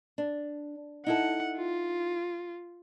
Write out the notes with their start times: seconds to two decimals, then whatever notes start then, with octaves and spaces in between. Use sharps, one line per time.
0.18 D4
1.06 D#4 E4 A4 F#5
1.57 F4